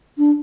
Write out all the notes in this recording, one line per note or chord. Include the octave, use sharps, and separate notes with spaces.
D4